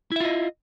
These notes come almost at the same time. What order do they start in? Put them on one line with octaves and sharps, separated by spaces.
E4 E5 F4 D#5